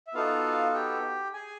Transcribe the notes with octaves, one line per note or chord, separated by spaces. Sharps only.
E5
B3 D#4 F4 F#4 A4 F5
G4 G5
G#4 G#5